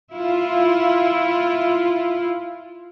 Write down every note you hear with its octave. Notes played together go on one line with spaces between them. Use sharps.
E4 F4